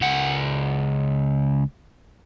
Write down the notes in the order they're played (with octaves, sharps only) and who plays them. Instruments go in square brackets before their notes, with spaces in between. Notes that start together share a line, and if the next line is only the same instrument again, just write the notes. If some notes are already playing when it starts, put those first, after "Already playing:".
[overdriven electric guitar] C#2 F#5